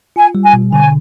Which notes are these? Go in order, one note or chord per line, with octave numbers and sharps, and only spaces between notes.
F4 G#5
G3
G#5
B2
D3 G#5